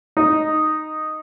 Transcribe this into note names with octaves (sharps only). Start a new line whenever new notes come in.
D#4